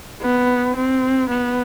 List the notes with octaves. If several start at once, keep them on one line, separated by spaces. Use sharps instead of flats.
B3
C4
B3